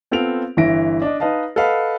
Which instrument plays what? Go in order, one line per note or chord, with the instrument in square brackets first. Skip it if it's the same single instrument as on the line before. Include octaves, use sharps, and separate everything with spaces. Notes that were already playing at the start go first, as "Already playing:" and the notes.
[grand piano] B3 C4 F4 A4 D7 F7
G1 E3 E4 E5 A#6 D7
D4 D#5
D#4 B4 D#5 F5 A5
A4 B4 D#5 F5 F#5 B5